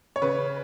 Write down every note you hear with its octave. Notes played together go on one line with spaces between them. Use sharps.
C#5
C#3 B4